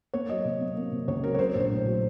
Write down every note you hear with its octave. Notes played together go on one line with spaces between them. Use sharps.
A#3 C#5
F#3 D#5
C3
A#3
A#3
C3
C#2 C#5
F#3 A#4
C#5
F#3 C5
C5
A#1
C5
A2
F#3